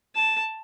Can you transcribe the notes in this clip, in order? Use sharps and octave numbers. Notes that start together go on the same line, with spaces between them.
A5